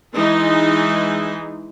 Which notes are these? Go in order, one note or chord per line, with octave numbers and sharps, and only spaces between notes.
E3 G#3 D#4